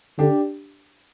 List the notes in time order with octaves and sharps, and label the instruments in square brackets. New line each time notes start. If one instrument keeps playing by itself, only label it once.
[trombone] D3 [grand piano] D4 G4